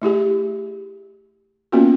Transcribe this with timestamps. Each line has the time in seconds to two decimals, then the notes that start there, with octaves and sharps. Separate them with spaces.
0.02 A3 E4 G4 G#4
1.72 A#3 B3 C#4 F4 F#4 A#4